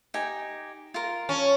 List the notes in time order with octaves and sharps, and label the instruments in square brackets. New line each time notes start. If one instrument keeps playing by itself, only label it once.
[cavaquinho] D#4 G4 G#5
F4 A#4
[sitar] C#4 [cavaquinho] A5